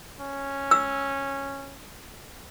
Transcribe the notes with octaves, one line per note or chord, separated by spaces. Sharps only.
C#4
E6